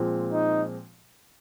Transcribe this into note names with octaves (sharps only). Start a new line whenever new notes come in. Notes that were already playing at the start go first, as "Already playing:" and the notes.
Already playing: A#2 F3 G#3 C4
D#4